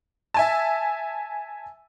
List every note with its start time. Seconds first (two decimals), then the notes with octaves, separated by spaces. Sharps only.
0.34 E5 G#5 A5